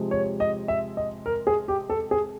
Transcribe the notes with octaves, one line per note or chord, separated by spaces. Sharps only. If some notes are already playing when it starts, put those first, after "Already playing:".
Already playing: C3 F3 G#3
C#5
D#5
E5
D#5
A#4
G#4
G4
A4
G#4